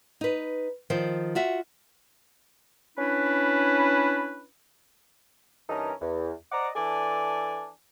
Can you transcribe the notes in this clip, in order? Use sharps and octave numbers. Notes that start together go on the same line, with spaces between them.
D#4 B4
D#3 F3 C5
F4 F#4 E5
C#4 D4 E4 B4
G2 E3 C#4 D#4 A#4 A5
E2
C5 D5 D#5 F#5 A#5 D6
E3 D4 A4 D5 G#5